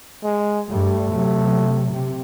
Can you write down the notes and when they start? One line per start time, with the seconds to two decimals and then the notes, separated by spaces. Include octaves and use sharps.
0.24 G#3
0.69 G2 G3 A3
1.12 C3 F#3
1.90 C3